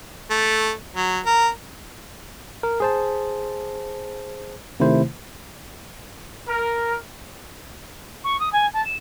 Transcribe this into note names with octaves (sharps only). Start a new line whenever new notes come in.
A3
F#3
A#4
A#4
G#4 C5 A5
C3 D#3 A3 E4 C5
A#4
C#6
D#6
G#5
A5
E7